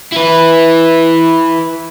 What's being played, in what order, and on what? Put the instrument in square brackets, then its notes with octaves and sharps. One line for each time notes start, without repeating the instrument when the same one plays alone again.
[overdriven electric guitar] E4 B4